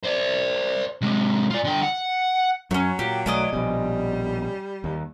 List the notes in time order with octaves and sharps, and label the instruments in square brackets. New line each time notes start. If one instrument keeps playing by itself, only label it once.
[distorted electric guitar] C5 D5
C3 G#3
F4 D5
D3 G5
F#5
[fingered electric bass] F#2 [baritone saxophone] F#3 [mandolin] A3 C#4
[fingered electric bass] A#2 [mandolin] G4
[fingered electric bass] B1 A3 [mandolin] C#4 D5 D#5
[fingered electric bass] A#1 B2 [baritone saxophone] G3
[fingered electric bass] D#2